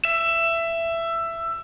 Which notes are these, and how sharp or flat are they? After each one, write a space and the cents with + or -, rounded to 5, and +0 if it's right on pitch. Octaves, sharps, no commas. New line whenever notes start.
E5 +15